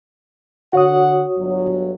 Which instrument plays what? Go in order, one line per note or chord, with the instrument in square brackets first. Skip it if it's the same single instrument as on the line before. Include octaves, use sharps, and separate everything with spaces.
[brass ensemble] D3 F#5 [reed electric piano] F#4 C#5 D#6
[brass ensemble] G1 F#3